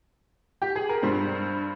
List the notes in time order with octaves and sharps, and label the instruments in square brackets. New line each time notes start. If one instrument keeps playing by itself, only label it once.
[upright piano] G4
G#4
A#4
G2 G3 C5